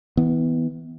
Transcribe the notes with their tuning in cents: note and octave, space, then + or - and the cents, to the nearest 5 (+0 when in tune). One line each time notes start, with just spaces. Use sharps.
E3 -35 B3 +0